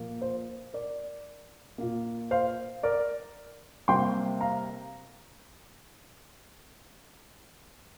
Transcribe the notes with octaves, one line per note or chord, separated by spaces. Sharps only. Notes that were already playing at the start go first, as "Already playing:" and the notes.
Already playing: A#2 F3 A#3
C5
A#4 D5
A#2 A#3
C5 F5
A#4 D5
C3 G3 A#3 G5 C6
F5 A#5